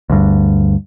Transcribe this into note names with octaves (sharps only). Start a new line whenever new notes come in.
D2 G2